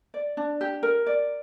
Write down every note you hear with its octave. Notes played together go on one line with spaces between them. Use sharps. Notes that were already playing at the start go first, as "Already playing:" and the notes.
D5
D4
G4
A#4
D5